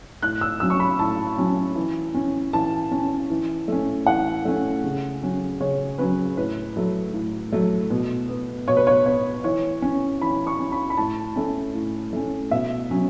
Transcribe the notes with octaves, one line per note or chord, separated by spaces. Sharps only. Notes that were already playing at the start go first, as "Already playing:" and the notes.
A2 F#6
E6
F#3 C#4 E6
C#6
B5
A2 A5
F#3 C#4
E3
C#4
E3 A5
C#4
E3
A3 C#4
E3 F#5
A3 C#4
C#3
F#3 C#4
C#3 C#5
F#3 C#4 B4
A2 B4
F#3 A3
A2
F#3 A3
B2
B3
B2 C#5
B4
C#5
B3 C#5
E3 C#5
C#4
E3 B5
C#6
C#4
B5
B5
A2 A5
A3 C#4
A2
A3 C#4
B2 E5
F#3 C#4